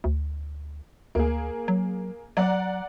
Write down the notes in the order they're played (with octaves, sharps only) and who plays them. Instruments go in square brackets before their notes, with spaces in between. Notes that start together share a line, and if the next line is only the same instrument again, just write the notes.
[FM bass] D2
[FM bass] D2 [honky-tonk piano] A#3 G#4
[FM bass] F#3
[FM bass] F#3 [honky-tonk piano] D5 F#5 A#5